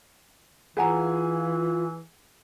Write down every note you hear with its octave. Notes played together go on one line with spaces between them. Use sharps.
E3 F4 G#4 B4 F#5 G#5 A#5